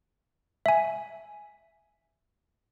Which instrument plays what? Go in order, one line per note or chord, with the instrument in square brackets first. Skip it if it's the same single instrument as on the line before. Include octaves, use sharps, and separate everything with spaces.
[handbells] E5 G#5